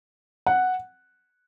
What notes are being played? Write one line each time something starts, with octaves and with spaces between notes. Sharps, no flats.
F#5